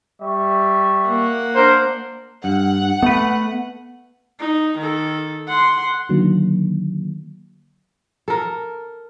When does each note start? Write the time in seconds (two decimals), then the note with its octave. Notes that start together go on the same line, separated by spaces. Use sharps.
0.21 G3 E5 C#6
1.07 A#3 F#5
1.55 D4 A#4 C5
2.44 G2 F#5
3.03 A3 B3 B4
4.39 D#4
4.78 D#3 A4
5.48 F#5 C6
6.09 D3 D#3 F#3 A#3
8.28 A4 A#4